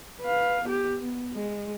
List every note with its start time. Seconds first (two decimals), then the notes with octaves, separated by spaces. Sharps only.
0.22 B4 F5
0.65 B3 G4
1.01 B3
1.33 G#3